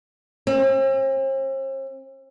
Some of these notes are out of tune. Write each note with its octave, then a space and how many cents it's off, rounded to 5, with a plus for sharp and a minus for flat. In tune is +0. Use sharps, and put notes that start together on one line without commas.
C4 +45